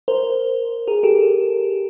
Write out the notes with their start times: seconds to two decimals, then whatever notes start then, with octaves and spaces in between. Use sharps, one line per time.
0.08 A#4 C5
0.88 G#4 A#4
1.03 G4 A4